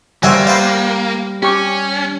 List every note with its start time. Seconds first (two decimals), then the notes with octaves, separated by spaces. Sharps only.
0.23 G3 A#3 F#4 C5 E5 G#5
0.47 B4 C5 F5 A6 C7
1.43 C#4 G4 C#6